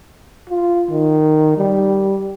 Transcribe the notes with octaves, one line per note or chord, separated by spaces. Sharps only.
F4
D#3
G3